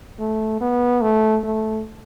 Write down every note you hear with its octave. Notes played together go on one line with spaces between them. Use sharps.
A3
B3
A3
A3